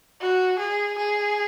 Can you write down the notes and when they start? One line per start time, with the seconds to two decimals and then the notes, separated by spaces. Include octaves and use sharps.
0.21 F#4
0.59 G#4
0.98 G#4